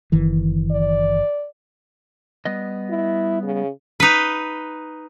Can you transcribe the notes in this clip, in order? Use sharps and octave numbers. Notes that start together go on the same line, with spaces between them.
F#1 D#3 E3
D5
G3 B3 D#5
E4
C#3
D#4 B4